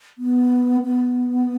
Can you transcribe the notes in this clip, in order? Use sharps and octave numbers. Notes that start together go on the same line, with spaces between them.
B3
B3